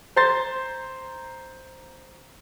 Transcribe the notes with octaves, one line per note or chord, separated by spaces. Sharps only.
C5 A#5 C6 G6 A6